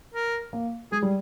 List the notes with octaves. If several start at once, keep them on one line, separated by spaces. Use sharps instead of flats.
A#4
A#3
G#3 G#4
G3